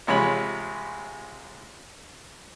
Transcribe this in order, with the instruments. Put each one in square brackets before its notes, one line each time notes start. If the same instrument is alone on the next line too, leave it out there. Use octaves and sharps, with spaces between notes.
[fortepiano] A1 C3 G#3 F4 C#5 B5